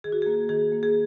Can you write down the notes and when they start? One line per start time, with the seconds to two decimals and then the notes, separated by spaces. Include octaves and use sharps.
0.04 D#3 G#4
0.12 F#4
0.22 A#3 G#4
0.49 D#3 G#4
0.72 A#3
0.83 G#4